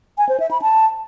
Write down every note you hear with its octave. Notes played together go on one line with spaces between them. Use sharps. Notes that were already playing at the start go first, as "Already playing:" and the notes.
G#5
C5
E5
B5
A5